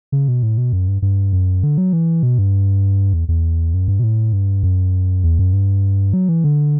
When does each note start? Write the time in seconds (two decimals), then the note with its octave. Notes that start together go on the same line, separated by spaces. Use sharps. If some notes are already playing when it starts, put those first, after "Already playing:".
0.12 C#3
0.28 B2
0.43 A2
0.58 B2
0.73 F#2
0.88 G2
1.02 G2
1.33 F#2
1.63 D3
1.78 F#3
1.93 E3
2.23 B2
2.38 G2
3.13 E2
3.28 E2
3.74 F#2
3.88 G2
3.99 B2
4.03 A2
4.33 G2
4.63 F#2
5.24 E2
5.39 F#2
5.53 G2
6.13 F#3
6.29 E3
6.44 D3